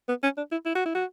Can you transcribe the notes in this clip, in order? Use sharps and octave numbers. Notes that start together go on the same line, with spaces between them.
B3
C#4
D4
E4
E4
F#4
E4
F#4